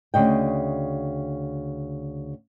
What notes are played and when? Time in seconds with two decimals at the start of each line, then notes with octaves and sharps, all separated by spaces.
0.14 D2 C#3 D#5 G5